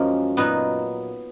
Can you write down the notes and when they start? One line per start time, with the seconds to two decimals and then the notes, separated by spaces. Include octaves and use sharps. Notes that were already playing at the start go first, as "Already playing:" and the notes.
Already playing: F#2 F3 G#3 A#3 C#4 D#4
0.37 A#2 F#3 B3 D#4